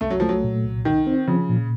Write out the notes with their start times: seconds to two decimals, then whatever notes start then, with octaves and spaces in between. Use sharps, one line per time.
0.01 C2 A3
0.10 F#3
0.20 F3 A3
0.29 F#3
0.44 A#2
0.65 C2
0.85 D#3 D#4
1.07 C4
1.27 C#3 F3
1.49 A#2